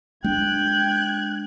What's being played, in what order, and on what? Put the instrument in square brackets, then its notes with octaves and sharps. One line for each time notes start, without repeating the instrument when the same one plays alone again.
[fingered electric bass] G#3 D4 [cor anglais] G5 [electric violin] F#6 G#6